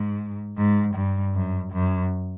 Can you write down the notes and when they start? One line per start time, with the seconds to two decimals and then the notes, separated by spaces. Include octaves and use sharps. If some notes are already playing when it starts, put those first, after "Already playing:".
Already playing: G#2
0.57 G#2
0.95 G2
1.34 F#2
1.73 F#2